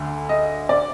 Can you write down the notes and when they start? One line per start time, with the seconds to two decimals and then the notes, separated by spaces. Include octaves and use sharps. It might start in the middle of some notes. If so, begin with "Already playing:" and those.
Already playing: D2 D3
0.29 D#5
0.69 D5